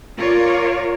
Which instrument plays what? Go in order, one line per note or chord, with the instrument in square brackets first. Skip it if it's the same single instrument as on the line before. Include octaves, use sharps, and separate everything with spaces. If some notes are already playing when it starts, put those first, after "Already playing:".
[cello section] F4 A#4 C#5 D5